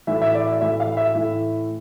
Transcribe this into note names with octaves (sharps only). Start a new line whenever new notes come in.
A2 E3 E5
E5
D5
E5
A2 E3 E5
F5
E5
A2 E3